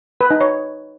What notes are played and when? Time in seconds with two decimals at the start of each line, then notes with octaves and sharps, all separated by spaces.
0.21 B4
0.31 D#4
0.41 C#5